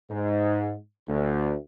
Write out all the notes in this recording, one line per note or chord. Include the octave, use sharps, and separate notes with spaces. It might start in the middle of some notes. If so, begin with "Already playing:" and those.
G#2
D2